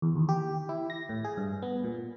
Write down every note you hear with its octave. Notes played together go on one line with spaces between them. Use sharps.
E2
D#2
G4
E4
A#6
A2
G#4
G2
B3
A#2